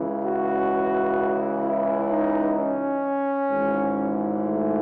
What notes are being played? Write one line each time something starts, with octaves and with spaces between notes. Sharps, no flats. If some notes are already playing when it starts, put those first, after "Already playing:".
Already playing: C#2 C#3 E3
F#4
E4
D#4
C#4
G#1 G#2 E3
A3